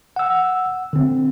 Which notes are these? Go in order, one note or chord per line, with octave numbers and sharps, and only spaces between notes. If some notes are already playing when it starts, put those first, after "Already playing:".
F#5 E6
D3 C4